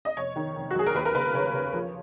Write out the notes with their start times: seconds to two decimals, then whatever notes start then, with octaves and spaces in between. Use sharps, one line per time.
0.05 D#5
0.16 F1 C#5
0.36 D#3
0.55 F1
0.71 F#4
0.76 F#3 G#4
0.86 A#4
0.94 D#2 B4
1.05 A#4
1.15 C#3 B4
1.34 C#3 C#5
1.54 C#3
1.74 F3